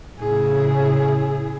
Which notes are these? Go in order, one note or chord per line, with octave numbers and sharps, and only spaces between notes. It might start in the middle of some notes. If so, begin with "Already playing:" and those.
A2 C#3 E4 G#4